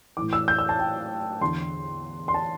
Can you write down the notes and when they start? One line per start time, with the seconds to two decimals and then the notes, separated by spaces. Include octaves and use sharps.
0.17 A2 E3 D6
0.33 E6
0.48 G6
0.59 E6
0.69 A5
0.79 G5
1.41 E2 D3 C6
2.28 C6
2.34 A5